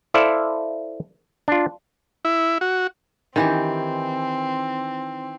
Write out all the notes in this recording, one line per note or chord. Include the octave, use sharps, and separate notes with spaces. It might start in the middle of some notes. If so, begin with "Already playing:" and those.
E4 A4 C5 D5 E5 F5
D4 F4
E4
F#4
D#3 E3 C4 G4